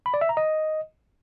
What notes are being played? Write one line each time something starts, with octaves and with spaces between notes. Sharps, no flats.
B5
D5
E5
A#5
D#5